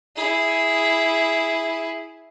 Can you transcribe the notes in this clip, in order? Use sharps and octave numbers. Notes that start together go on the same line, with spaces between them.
E4 G#4